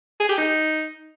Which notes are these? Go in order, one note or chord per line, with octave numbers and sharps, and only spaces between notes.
G#4
G4
D#4